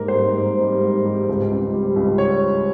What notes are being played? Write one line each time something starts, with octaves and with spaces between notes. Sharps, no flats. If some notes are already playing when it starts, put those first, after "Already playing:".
Already playing: G#2 G3 A#3 A#4
C5
G#2
G#2
G3
G#2
G3
C#2
C#2
G3
C#2
C#5